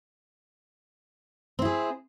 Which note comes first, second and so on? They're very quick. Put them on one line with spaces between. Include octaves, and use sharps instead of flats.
C4 E4 G#4